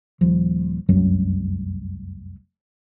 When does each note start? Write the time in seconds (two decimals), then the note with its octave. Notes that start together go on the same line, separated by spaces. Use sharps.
0.21 D#1 F3
0.89 F1 C2 F#2 F#3